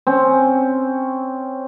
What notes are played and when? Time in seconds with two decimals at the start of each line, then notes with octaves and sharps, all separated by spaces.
0.07 C4 C#4